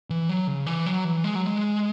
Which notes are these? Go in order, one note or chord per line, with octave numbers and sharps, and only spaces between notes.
E3
F#3
C#3
E3
F#3
E3
G#3
F#3
G#3